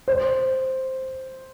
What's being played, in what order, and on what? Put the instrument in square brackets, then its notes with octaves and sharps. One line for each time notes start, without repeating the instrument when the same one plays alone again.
[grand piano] C5